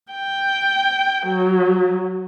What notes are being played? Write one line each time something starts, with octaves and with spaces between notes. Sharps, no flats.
G5
F#3